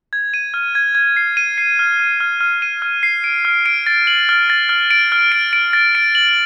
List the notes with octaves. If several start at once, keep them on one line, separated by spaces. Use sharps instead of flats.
G#6
D#7
F6
G#6
G#6
C7
D#7
C7
F6
F6
F6
F6
D#7
F6
C7
D7
F6
D7
A6
F#7
F6
A6
F6
D7
F6
D7
D7
A6
D7
F#7